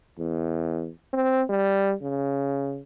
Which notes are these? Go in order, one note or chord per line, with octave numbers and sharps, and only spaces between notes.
E2
C4
G3
C#3